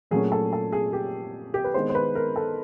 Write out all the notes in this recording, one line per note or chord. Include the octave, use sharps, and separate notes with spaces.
A#2 F#3 A3 C#4 G#4
A4
A4
G#4
G4
G4
B4
D#3 G#3 B3 D4 C5
C5
B4
A#4
A4